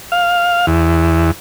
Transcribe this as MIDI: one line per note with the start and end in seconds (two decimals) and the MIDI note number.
0.12 0.66 77
0.67 1.31 40